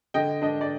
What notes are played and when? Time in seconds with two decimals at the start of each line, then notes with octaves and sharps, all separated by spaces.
0.14 D3 D#5 G5
0.42 D4 D#5
0.61 D5